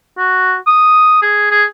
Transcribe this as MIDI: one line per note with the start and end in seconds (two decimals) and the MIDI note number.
0.18 0.56 66
0.67 1.19 87
1.22 1.51 68
1.51 1.64 68